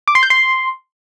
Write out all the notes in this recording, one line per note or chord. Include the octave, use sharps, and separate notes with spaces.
D6
C6
G6
C6